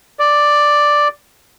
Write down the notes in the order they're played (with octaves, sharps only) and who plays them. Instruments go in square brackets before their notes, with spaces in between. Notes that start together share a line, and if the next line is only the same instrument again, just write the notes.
[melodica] D5